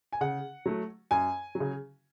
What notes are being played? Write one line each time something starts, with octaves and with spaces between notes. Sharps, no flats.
G#5
C#3 F#5
F#3 A3
F#2 G#5
F#3
C#3